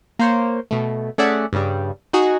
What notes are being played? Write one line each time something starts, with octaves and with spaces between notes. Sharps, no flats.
A#3 C5 C#5
B2 A3
A3 C#4 G#4 D5 E5 F#5
G2 C#3 G3
D#4 F#4 G#4